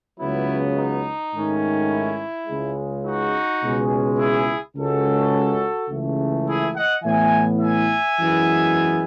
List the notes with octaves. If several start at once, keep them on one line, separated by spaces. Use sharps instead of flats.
C#2 C#3 F#3 B3 E4
D#4
G#2 D#3 A3 C#4
E4
C#2 C#3 G#3
D#4 F#4
C#2 B2 G#3 C#4
E4 G#4
C#2 C#3 G#3 C#4 F#4 A4
C#2 C#3 E3 A3
E4 G#4
D#5 F#5
A2 E3 B3 E5 G#5
E5 G#5
F#2 E3 G#3 B3